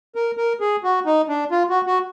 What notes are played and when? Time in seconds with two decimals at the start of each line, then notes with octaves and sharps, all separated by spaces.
0.15 A#4
0.37 A#4
0.60 G#4
0.84 F#4
1.06 D#4
1.28 D4
1.51 F4
1.69 F#4
1.87 F#4